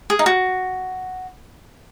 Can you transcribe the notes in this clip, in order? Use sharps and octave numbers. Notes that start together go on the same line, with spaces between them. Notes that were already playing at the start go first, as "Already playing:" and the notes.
G#4
D#4
F#4